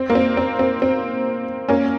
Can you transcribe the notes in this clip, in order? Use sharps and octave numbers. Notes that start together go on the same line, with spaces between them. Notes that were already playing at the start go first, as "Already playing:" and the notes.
Already playing: C4
A#3
C4
C4
C4
C4
A#3 C#4